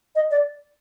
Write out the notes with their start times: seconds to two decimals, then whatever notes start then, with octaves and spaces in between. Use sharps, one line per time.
0.15 D#5
0.31 D5